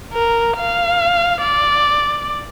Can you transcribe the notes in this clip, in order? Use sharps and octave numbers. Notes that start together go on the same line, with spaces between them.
A#4
F5
D5